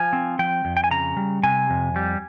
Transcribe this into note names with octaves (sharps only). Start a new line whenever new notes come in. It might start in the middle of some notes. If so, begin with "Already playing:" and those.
Already playing: F3 G#5
C4
F3 G5
F2
G5
G#5
C#3 A#5
G3
C3 G#5
F2
G3